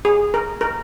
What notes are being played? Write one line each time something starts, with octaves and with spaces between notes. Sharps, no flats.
G#4
A#4
A#4